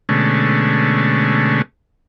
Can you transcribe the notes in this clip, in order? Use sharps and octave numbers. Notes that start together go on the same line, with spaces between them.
B2 D3 G#3 A3 C#4